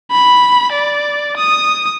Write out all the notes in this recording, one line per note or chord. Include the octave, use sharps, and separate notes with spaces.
B5
D5
D#6